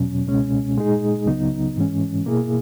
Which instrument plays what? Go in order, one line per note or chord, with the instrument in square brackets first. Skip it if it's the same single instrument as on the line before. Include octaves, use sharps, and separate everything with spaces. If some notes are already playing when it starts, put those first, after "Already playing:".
Already playing: [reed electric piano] E2 B2 F#3 C#4
C#2 B2 G#3 C#4
A#2 G#3 D#4 G#4
C#2 C#3 F#3 B3 D#4
G#2 E3 G#3 C#4
B2 A#3 E4 G#4